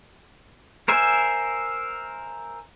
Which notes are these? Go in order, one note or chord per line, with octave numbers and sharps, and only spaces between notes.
A#4 C5 E5 G#5